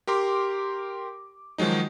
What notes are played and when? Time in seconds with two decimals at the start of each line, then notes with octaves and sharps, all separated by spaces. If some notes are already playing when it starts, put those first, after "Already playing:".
0.07 G4 A#4 C6 D6
1.58 D#3 F3 F#3 G#3 D#4